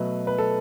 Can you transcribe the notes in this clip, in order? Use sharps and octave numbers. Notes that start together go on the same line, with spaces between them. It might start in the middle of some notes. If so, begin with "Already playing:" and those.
Already playing: B2 F#3 A3 B4
B4
A4